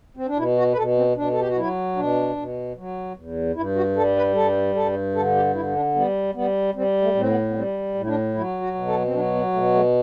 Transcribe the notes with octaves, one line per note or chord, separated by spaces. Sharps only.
C4
D4
B2 E4
F#4
B4
B2 A4
C4
B2 D4
A4
G4
F#4
F#3 E4
B2 D4
B2
F#3
E2
G2 E4
F#4
G3 A4
B4
G2 A4
G2 A4
D3 A4
G4
D3 E4
D4
G3 B3
G3 B3
G3 C4
A3
A2 C4
B3
B3
G3 C4
A2
E4
D4
F#3 E4
F#4
B2
A4
C4
F#3 D4
B3
B2 A3
A3